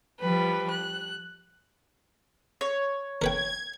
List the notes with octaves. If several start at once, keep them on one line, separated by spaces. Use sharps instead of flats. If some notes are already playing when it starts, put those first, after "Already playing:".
F3 G3 B4
F#6
C#5
A#4 B4 G5 G#6